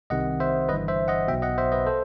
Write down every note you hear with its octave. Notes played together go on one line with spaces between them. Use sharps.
C2 C3 D#3 D#5 F#5
C5 E5
G1 G2 E3 B4 D#5
C5 E5
D#5 F#5
B1 B2 E5 G5
D#5 F#5
C5 E5
B4 D#5
A4 C5